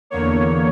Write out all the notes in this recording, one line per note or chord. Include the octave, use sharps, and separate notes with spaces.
E2 D3 A#3 C#5